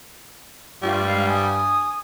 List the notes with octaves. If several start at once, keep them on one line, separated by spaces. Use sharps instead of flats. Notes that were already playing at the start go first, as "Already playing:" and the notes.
G2 G3 A3 F4
G#3 D5 F5
G#5 D#6